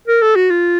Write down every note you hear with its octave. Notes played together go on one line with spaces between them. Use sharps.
A#4
A4
F#4
F4